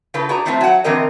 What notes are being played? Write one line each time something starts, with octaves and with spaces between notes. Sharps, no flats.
C#3 F4 A4 B4
F#4 G#4 D5 A#5
F#2 A2 D#3 A3 C4 F4
F#3 F#5
A#2 D3 E3 C4 A#4 D#5